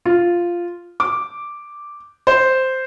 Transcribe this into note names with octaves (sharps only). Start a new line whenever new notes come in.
F4
D6
C5